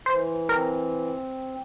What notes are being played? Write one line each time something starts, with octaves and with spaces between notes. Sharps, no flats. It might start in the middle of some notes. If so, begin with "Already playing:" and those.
E3 C5
C4 A#4